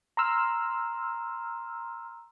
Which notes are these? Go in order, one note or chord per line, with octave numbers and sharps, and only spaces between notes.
A#5 C6 E6 F6